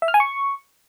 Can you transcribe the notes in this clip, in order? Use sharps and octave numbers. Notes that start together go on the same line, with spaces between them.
E5
F6
G#5
C#6